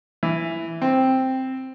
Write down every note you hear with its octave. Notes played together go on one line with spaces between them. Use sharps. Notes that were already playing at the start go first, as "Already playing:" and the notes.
E3
C4